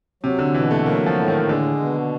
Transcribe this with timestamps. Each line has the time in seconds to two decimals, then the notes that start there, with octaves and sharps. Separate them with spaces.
0.23 C3 F#3
0.39 D3
0.54 B2 E3
0.71 A3
0.86 F#3 A#3
1.06 F3
1.17 A2
1.28 D#3
1.49 D3 G#3
1.80 B2